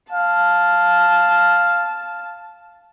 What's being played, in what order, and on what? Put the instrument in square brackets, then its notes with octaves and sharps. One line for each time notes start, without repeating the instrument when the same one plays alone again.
[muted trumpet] F5 [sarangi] A5